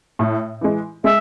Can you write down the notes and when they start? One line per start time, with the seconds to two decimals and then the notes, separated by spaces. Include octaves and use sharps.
0.19 A2
0.61 E3 G#3
1.04 G#3 E5